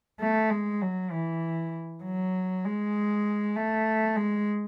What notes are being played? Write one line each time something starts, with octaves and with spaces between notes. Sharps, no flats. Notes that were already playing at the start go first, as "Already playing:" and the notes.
A3
G#3
F#3
E3
F#3
G#3
A3
G#3